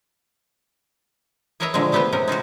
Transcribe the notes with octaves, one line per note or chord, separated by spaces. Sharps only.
G#4 A#4 B4 C#5 D#5 E5
A#2 D3 D#3 F3 G#3
G#3 A3 B3 G4 B4 C5
C3 C#4 D#4 A#4
G#3 D#4 F4 F#4